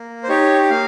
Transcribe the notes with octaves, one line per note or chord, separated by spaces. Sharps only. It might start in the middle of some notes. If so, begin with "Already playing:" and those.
Already playing: A#3
C5
D#4 G4 C#5
A#3 F5